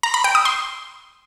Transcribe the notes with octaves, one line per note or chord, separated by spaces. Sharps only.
A#5
B5
G5
D#6
C6